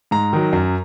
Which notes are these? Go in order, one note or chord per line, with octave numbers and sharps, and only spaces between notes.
G#2 A#5
D#3 F#3
F#2